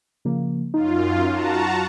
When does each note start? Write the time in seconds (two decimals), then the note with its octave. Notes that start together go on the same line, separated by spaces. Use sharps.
0.25 C#3 F3 A#3
0.74 F#2 D#4 F4
1.28 F#4 A5 A#5